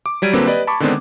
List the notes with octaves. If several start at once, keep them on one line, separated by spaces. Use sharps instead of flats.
D6
F#3 G3 G#6 D7 D#7
D3 F#3 A#3 C4 B4
G4 B4 D5 D#5
A5 B5 C#6 D6
D3 D#3 G#3 B3 C4 D4